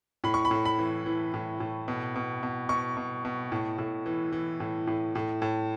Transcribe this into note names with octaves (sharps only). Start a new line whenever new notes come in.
A2 B5
C#6
B5
A2
B5
E3
E3
A2
A2
B2
B2
B2
B2 C#6
B2
B2
A2
A2
E3
E3
A2
A2
A2
A2